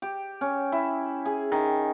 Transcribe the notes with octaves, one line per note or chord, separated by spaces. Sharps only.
G4
C#4
E4
G#4
D#3